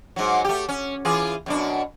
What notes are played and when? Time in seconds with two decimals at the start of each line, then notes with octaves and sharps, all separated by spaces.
0.16 G#2 F#3
0.44 A3 G4
0.69 C#4
1.05 E3 F4 G#4
1.46 F#2 B2 D4